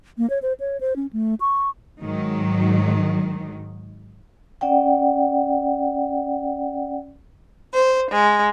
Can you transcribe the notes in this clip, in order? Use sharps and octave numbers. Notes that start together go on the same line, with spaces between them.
A#3
C#5
C5
C#5
C5
C#4
A3
C#6
G#2 D#3 F#3
C#4 D5 F#5 G5
C5
G#3